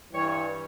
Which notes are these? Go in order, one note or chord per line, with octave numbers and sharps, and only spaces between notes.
G2 E3 G3 C#5